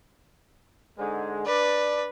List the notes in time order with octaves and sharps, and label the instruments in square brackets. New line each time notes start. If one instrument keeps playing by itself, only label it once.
[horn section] G#2 D3 G#3
[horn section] D4 D5 [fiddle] B4